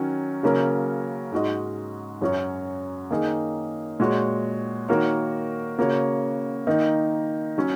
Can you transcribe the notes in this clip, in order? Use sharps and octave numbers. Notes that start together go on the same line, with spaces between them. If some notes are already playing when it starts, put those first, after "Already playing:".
Already playing: D#3 F#3 C#4 A#4
C#3 F#3 A#3 C#4 A#4
G#2 G#3 F#4 D#5
F#2 F#3 C#4 F#4 C#5
D#3 A#3 D#4 G#4
A#2 G#3 F#4 C#5
D#3 A#3 F#4 A#4 C#5
C#3 A#3 F#4 C#5
D#3 A#3 D#4
F#3 C#4